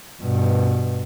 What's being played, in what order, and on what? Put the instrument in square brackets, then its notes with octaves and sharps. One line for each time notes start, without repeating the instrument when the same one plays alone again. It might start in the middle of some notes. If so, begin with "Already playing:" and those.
[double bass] G2 B2